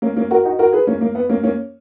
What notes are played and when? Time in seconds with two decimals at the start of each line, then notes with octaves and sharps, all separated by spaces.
0.02 A#3 C#4
0.16 A#3 C#4
0.31 F#4 A#4
0.45 D#4 F#4
0.59 F#4 A#4
0.73 G#4 B4
0.87 A#3 C#4
1.01 A#3
1.15 B3
1.29 A#3 C#4
1.43 A#3 C#4